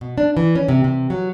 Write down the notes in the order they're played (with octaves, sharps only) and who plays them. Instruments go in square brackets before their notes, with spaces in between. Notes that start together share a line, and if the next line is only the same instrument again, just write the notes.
[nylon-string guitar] B2
D4
E3
C#4
C3
C3
F#3